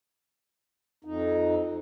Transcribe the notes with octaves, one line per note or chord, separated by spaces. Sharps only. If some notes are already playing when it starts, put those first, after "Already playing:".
F2 D#4